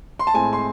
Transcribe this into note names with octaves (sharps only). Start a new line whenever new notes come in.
C6
A5
A2 G#3 C4 G#5
C6